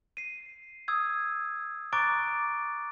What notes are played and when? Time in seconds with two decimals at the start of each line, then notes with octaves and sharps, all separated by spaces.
0.17 C7 D#7
0.88 D#6 E6 G#6
1.93 A#5 C#6 D6 F#6 A6 D7